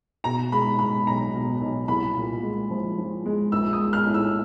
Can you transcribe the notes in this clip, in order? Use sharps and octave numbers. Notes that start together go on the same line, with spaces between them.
B2 A#5
G#3 B5
G#3 B5
B1 A#5
B2
B1
C2 B5
A#2
G#3
F3
F3
G#3
A#1 E6
D#6
G#3
F6
A2
E6